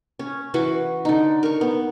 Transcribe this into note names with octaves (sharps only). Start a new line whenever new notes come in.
C#4
E3 F#4 B4
D3 D#4
A#4 C#6
B3